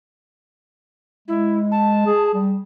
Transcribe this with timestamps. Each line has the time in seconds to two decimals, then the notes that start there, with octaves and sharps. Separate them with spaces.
1.28 G#3 E4
1.72 A5
2.06 G#4
2.34 G3